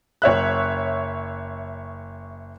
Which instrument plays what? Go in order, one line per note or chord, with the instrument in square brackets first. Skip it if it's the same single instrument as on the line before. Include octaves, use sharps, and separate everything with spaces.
[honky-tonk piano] F#1 C#5 E5 F#6